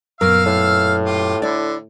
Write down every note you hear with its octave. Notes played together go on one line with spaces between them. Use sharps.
F#2 A#2 B3 A#4 F5 E6 F6
A2
F4 G4
D3 E4 D5